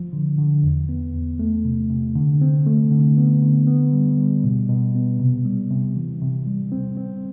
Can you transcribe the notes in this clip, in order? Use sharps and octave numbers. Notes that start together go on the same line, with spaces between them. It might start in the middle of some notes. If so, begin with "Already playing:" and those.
Already playing: F3
D3
D3
E2
B3
E2
A3
C3
C3
D3
C4
A3
D3
B3
D3
B3
G3
G3
B2
B2
B3
C3
G3
C3
E3
C3
G3
C4
C4